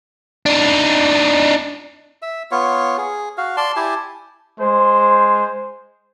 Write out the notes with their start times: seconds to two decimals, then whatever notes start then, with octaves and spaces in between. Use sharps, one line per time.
0.46 D4 D#4
2.22 E5
2.51 B3 F4 C#5
2.98 G#4
3.37 F#4 F5
3.57 D5 A5 C6
3.76 E4 G4 G#5 A5
4.59 G#3 C5